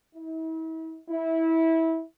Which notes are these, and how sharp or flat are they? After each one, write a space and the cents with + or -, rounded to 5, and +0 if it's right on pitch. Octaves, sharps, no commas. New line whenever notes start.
E4 -40
E4 -20